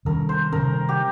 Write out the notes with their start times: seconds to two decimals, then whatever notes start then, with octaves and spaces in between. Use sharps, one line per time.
0.05 C3 D#3 G3 C#4 A#4
0.29 C5
0.52 C3 D#3 G3 C#4 A#4
0.89 G4